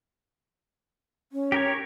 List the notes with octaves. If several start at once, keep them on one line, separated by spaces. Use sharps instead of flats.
C#4
G4 A#4 C#5